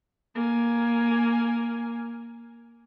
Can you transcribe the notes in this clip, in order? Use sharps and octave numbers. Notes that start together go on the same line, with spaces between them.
A#3 G#5